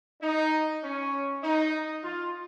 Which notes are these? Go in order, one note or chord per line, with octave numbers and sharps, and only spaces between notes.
D#4
C#4
D#4
F4